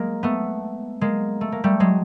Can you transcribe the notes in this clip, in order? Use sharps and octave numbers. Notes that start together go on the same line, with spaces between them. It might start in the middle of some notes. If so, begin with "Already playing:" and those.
Already playing: G#3 A#3
A3 B3
G#3 A#3
A3
A#3
G3 A3
F#3 G#3